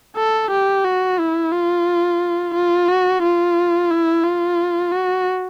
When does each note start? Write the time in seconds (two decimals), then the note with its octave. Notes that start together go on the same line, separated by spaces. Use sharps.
0.17 A4
0.51 G4
0.85 F#4
1.19 E4
1.52 F4
2.55 F4
2.88 F#4
3.23 F4
3.91 E4
4.24 F4
4.92 F#4